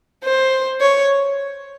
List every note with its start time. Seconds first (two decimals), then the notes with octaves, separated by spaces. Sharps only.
0.25 C5
0.81 C#5